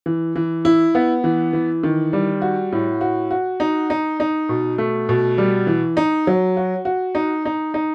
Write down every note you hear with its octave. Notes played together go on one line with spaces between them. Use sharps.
E3
E3
E4
B3
E3
E3
D#3
G3
F#4
A2
F#4
F#4
D#4
D#4
D#4
B2
A3
B2
G3
E3
D#4
F#3
F#4
F#4
D#4
D#4
D#4